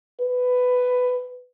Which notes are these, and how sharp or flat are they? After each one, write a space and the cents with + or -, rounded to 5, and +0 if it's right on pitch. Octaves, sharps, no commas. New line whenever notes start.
B4 +10